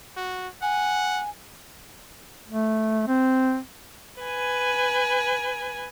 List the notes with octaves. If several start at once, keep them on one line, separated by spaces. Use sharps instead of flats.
F#4
F#5 G#5
A3
C4
B4 G#5